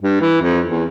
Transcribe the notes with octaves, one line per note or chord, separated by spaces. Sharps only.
G2
E3
F2
E2